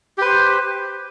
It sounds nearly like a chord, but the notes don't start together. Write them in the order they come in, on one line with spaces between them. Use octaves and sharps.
G4 B4 C5